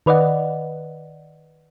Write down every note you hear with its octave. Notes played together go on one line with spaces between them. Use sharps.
D#3 B4 D5 D#5 F#5